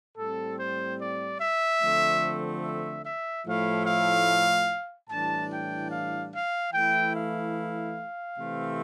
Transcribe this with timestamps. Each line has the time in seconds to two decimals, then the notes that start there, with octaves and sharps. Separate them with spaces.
0.17 A2 G3 C4 A4
0.58 C5
0.99 D5
1.40 E5
1.81 D3 F3 A3 C4
2.63 E5
3.05 E5
3.46 A2 F3 A3 E4 F5
3.86 F5
5.09 A2 E3 G3 D4 A5
5.50 G5
5.91 F5
6.33 F5
6.73 E3 A3 E4 G5
7.14 F5
8.38 C3 E3 A3 C4